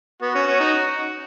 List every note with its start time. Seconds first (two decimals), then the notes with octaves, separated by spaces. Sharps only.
0.22 B3 F#4
0.35 C#4
0.47 C#4
0.60 D#4